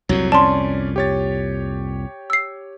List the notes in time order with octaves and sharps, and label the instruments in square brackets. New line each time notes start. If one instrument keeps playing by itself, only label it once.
[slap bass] C2 F2 A#2 [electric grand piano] F#3
[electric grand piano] C#4 D5 [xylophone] A5 C6
[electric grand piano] G4 C#5 A6
[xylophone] E6 C7